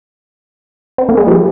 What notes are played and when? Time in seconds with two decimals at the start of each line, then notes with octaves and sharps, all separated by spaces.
0.98 C4
1.09 A#3
1.17 G#3
1.27 F3 G3